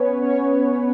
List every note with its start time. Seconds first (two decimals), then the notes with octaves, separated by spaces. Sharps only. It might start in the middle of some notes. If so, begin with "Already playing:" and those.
Already playing: B3 C#4 B4 C#5
0.22 C#4 C#5